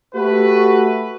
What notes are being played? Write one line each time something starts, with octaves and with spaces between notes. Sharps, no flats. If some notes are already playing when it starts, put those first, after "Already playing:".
A3 F#4 G4 B4